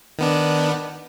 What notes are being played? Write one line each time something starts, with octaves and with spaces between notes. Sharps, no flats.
D#3 B3 D4